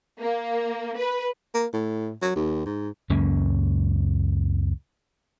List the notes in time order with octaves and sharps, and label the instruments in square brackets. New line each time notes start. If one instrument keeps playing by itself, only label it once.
[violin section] A#3
B4
[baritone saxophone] A#3
A2
F#3
D#2
G#2
[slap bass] C#2 F#2 A#3 C#4